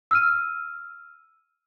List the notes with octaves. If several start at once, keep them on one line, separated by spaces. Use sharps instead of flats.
E6 F6 D#7